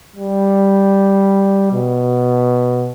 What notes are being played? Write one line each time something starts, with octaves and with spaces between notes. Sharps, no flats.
G3
B2